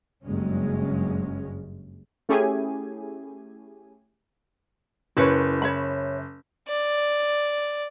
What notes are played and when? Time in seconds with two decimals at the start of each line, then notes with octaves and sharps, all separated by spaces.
0.23 F#1 G2 G#3 C#4
2.29 A3 C#4 E4 G4 G#4 G#5
5.17 F#1 E4 B4 C#5
5.62 C#5 E5 B5
6.68 D5